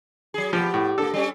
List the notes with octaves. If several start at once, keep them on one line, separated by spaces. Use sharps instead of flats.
F#3 G#4
F3 B3 G4
A2
A#3 D4 A4
G3 C#4